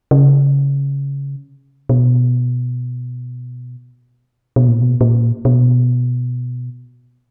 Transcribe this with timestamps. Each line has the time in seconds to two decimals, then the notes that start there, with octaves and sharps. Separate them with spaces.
0.11 C#3
1.89 B2
4.56 B2
4.68 A#2
4.82 B2
5.01 A#2
5.45 B2